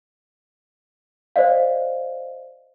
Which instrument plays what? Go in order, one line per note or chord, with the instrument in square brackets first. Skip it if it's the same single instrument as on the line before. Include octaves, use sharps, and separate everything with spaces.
[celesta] C5 D5 D#5 F5